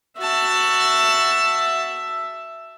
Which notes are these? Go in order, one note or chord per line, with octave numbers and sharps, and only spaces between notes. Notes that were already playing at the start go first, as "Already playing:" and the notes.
F#4 E5 A5